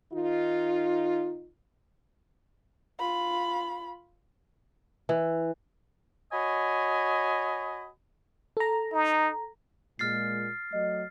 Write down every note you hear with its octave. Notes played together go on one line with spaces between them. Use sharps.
D#3 D#4 F4
F4 B5
E3
F#4 C#5 D#5 G#5 B5
A4 A#5
D#4
A#2 G#3 F6 A6 C7
F#3 A3 D#5